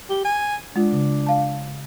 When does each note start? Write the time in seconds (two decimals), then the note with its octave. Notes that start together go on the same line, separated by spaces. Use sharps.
0.10 G4
0.25 G#5
0.76 G#3 D4 F4
0.92 C#3
1.26 D5 F5 A5